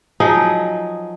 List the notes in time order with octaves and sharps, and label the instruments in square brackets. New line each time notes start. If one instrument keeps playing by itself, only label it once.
[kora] F3 F#3 D#4 G#4